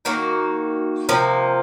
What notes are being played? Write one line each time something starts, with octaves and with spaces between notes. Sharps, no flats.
D#3 A#3 D#4 F#4
C3 F3 A#3